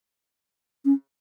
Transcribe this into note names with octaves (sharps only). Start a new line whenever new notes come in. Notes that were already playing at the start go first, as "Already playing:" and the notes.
C#4